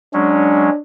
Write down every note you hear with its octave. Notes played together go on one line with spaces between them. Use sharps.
F#3 G#3 C#4 D4